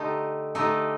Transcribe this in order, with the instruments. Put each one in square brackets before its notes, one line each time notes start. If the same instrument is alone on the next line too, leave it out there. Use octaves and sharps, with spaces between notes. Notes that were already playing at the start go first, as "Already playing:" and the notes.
Already playing: [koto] D3 A3 D#4 G4
D3 A3 D#4 G4